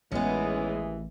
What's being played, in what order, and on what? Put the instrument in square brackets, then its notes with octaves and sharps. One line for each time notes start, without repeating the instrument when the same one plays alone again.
[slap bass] A1 [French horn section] D#2 E3 [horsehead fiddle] G#3 G#4 [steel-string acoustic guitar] B3 C#4